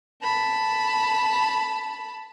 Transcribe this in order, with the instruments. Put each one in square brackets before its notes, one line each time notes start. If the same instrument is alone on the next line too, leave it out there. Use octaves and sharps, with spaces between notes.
[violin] A5 B5